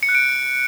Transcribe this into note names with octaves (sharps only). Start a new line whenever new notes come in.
C#7
F#6
D7